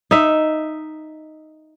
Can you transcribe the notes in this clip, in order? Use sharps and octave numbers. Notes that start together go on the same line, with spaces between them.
D#4 E5